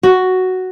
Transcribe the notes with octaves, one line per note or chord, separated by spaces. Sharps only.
F#4